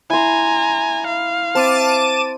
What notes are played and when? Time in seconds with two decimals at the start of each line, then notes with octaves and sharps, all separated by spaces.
0.10 E4 G#5 A#5 C6
1.07 F5
1.55 C4 A5 D6 D#7